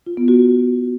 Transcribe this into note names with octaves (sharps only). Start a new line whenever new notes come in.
F4
B3
F#4